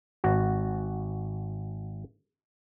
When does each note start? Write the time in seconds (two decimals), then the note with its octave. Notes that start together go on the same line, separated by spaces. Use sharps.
0.24 G#1 F#4